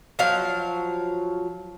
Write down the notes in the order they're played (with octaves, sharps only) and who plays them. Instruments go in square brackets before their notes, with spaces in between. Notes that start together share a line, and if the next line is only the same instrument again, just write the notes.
[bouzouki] F3 F#3 F5